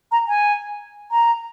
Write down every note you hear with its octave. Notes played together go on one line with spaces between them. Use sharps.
A#5
G#5
A#5